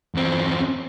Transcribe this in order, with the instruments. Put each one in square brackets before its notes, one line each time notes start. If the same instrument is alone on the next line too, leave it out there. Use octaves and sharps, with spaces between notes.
[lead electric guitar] E2 C4